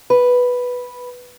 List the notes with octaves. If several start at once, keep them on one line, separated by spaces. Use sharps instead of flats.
B4